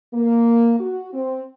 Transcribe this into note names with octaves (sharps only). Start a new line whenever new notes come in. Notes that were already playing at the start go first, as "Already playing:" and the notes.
A#3
F#4
C4